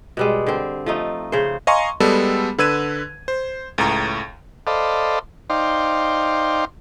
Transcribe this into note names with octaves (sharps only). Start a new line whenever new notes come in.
B2 G3 G#3
D3 C4
F3 A3 D#4
C#3 C5
D#5 F5 G#5 A#5 C6 C#6
G3 G#3 B3 A4
D3 B4 E6 G#6 D#7
C5
C#2 A2 A#5
A4 C5 D5 D#5 F5 B5
D#4 C5 D5 F5 G5 C6